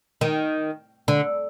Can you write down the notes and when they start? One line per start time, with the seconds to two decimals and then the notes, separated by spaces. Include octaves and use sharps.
0.21 D#3
1.08 D3